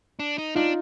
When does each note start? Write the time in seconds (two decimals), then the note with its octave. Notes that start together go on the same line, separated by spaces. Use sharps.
0.19 D4
0.38 D#4
0.55 D4 D#4 F4